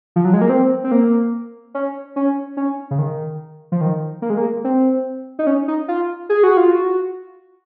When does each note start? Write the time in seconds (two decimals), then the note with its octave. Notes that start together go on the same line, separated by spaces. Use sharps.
0.16 F3
0.25 F#3
0.33 G#3
0.41 A#3
0.49 C4
0.84 C4
0.92 A#3
1.74 C#4
2.16 C#4
2.57 C#4
2.91 C#3
2.99 D#3
3.72 F3
3.81 D#3
4.22 A#3
4.30 G#3
4.38 A#3
4.64 C4
5.39 D#4
5.47 C#4
5.68 D#4
5.88 F4
6.29 G#4
6.43 F#4
6.57 F4
6.71 F#4